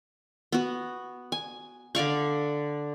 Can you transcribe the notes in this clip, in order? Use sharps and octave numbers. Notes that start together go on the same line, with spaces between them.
B3 F#4
G#5
D3 D5 F5 C#6